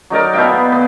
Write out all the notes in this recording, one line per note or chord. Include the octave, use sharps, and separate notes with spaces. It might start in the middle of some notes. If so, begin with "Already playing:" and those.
F#3 D#4 A#4 D5
B2 E5 F5 G5
B3
B3